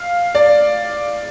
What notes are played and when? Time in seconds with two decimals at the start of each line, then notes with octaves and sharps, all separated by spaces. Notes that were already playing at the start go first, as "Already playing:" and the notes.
Already playing: F5
0.35 D5